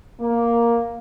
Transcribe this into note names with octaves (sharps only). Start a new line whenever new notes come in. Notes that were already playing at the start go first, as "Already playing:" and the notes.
A#3